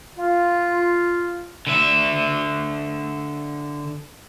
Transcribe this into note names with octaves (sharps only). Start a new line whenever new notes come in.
F4
D3 E5